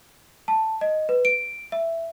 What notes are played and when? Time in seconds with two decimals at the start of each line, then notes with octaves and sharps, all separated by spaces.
0.48 A5
0.81 D#5
1.09 B4
1.25 D7
1.72 E5